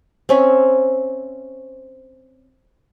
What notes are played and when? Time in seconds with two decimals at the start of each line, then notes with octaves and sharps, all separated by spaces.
0.29 C4 C#4 E5